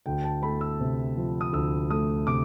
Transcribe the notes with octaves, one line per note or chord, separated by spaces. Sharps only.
D2 G5
A5
A3 B5
E6
C3
F3
D#6
D2 E6
A3 D#6
C3 D6